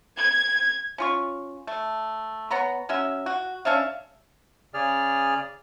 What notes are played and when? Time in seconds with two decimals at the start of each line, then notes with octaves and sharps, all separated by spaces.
0.17 G#6
0.98 C#4 F4 C#6
1.67 A3
2.50 B3 C#5 A#5 B5
2.89 F#3 C#4 E5
3.26 F#4
3.65 C#4 D4 E5 F5
4.74 C#3 G#4 D5 F6